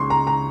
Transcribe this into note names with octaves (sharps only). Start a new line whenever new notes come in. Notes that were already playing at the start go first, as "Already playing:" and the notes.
Already playing: C#2 C#3 G#3 C6 C#6
A#5
A#5